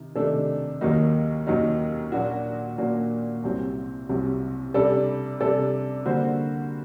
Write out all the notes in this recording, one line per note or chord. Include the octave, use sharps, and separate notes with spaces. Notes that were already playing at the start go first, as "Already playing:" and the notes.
Already playing: C3 D#3
C3 D#3 A3 D4 A4
D#2 D#3 F#3 A#3 D#4
D#2 D#3 F#3 A#3 D#4
A#2 F#3 A#3 D4 F#4
A#2 F#3 A#3 D4 F#4
C2 C3 F#3 C4
C2 C3 F#3 C4
C3 G3 D4 A4 D5
C3 G3 D4 A4 D5
D3 G3 A#3 F#4 C5